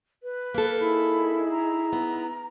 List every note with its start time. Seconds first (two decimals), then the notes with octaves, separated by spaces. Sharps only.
0.23 B4
0.55 A#3 A4
0.80 D#4 E4 G#4 B5
1.51 A#5
1.93 B3